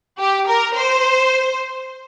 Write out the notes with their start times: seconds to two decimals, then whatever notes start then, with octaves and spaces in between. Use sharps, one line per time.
0.19 G4
0.48 A#4
0.75 C5